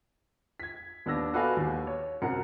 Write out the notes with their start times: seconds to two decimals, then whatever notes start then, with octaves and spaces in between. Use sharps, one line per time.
0.60 G#6 B6
1.06 D#2 B3 D4 E6 A#6
1.34 F#4 A4 B4 D5 F5 G#5
1.57 D#2
1.87 C#5
2.22 C2 F#2 A#4 F#5 C#7